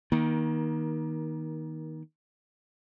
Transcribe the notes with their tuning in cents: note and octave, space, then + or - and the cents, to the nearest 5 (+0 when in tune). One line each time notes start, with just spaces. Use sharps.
D#3 +15 A#3 +30